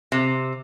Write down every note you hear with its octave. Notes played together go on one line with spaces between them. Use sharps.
C3